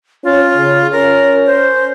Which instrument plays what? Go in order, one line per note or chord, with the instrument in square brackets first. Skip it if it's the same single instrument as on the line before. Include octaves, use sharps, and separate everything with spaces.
[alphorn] C#4 [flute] F4
[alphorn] C#3
[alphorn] C#4 [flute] A#4
[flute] C5